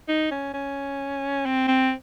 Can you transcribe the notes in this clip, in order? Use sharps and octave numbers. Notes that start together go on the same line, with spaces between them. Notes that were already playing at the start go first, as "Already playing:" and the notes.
D#4
C#4
C#4
C4
C4